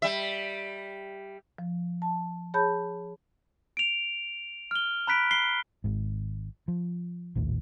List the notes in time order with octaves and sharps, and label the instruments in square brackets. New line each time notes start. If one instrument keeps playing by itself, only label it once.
[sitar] G3 E5
[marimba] F3
A5
G#4 C#5 A5 B5 G6
[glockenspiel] D7 F7
F6 G7
A#5 B5 F#6 B6 D7
C7 G7
[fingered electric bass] G#1 G#2
F3
A#1 D#2 A2